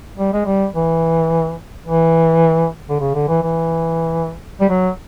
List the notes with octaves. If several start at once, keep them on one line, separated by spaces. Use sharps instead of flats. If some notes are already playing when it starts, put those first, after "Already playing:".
G3
G#3
G3
E3
E3
D3
C#3
D3
E3
E3
G3
F#3